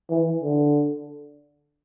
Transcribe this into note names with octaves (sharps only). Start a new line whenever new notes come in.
E3
D3